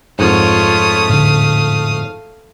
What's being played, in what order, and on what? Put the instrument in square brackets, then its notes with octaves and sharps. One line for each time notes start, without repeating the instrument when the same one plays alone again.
[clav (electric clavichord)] F2 G#2 [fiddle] A3 D#6 [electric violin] F4 C#5
[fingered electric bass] A2 D3 [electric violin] F5